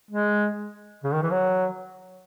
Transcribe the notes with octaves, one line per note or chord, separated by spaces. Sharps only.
G#3
C#3
D#3
E3
F#3